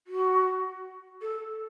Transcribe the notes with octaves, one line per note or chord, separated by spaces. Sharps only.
F#4
A4